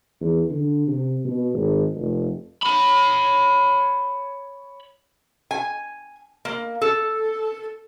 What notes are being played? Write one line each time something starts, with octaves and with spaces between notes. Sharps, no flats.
E2
D3
C3
B2
G#1
F1
C#5 B5
G#5
A#3
A4